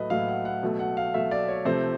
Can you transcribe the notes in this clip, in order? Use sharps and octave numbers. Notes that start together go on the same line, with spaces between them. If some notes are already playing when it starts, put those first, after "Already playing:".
Already playing: A2 F#3 A3 B4 D#5
A2 F#3 A3 F5
F#5
F#5
B2 F#3 A3
F#5
F5
B2 F#3 A3 E5
D5
C#5
C3 F3 A3 C5